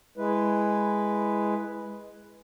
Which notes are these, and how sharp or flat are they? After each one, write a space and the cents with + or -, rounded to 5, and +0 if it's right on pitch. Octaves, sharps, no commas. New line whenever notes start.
G#3 +0 E4 +0 B4 +0